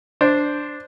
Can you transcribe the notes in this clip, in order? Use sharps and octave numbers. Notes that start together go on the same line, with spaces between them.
D4 C5